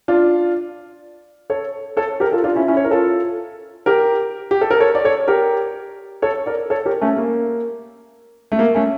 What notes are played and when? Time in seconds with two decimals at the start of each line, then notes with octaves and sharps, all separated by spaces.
0.08 D4 F4
1.50 A4 C#5
1.97 A4 C#5
2.20 G4 A#4
2.32 F4 A4
2.44 D4 F4
2.55 C#4 E4
2.68 C#4 E4
2.77 C#5
2.84 A#4
2.91 F4 A4
3.86 G4 A#4
4.51 G4
4.61 A4
4.71 A#4
4.80 A4 C#5
4.95 D5
5.05 A4 C#5
5.28 G4 A#4
6.22 A4 C#5
6.46 A#4 D5
6.70 A4 C#5
6.86 G4 A#4
7.01 A3 C#4
7.17 A#3
8.52 A3
8.59 A#3
8.75 A3 C#4